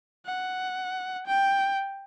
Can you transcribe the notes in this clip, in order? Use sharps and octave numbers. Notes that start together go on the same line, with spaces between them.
F#5
G5